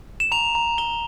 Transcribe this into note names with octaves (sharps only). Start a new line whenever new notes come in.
E7
A#5 F7
A#5
A#5 G7